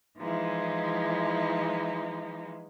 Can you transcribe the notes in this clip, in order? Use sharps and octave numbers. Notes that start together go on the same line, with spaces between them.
E3 F3 G#3 D#4 E4